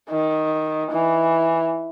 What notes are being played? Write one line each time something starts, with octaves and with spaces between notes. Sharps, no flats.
D#3
E3